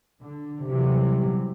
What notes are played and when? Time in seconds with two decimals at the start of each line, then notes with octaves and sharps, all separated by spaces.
0.21 D3
0.68 C3 E3 F#3 G3